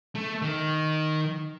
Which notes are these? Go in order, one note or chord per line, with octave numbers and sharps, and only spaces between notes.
A3
D#3